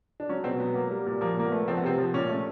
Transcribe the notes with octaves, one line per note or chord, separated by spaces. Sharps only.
D4
F#3 C#4
B2 C4
F#3 B3
A#3
G3
A#2
F3 A#3
A#2 A#3
B3
A3
F3 C4
B3
C3 C4
F3
A#2 C#4
A3